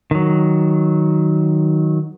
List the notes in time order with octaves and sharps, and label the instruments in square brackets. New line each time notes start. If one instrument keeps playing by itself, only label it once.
[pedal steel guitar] D#3 F#3